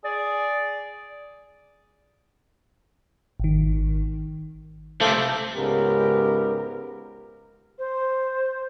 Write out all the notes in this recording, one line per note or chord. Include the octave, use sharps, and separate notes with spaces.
G#4 D5
G#1 D#3
C3 A3 A4 C5 F5 D6
C#2 G#2 C#3 B3 G4 A#4
C5